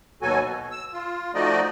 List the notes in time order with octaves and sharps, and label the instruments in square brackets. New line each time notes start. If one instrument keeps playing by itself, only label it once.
[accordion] D#2 B2 F#3 F#4 A4 G#5
B2
E6
F4
F3 A3 D#4 F#4 D5 D#5